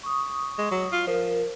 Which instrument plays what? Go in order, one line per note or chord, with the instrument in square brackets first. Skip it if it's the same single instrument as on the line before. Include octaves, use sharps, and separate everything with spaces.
[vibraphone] C#6 D#6
[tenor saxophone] G#3
F#3
F4
[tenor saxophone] F3 [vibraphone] A#4